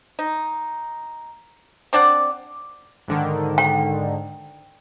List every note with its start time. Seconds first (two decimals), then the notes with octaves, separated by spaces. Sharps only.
0.19 D#4
1.93 C4 D4 D5 F#5
3.08 G#2 D3 D#3
3.58 G5